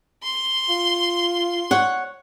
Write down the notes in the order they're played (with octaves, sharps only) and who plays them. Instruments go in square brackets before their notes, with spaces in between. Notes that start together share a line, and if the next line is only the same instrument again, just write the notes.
[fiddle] C6
[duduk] F4
[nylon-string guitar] C#5 F#5